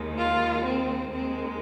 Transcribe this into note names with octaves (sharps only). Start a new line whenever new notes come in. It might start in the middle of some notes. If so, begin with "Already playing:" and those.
Already playing: D#2 D#3 G#3
F4
C4
D#2 D#3 G#3 C4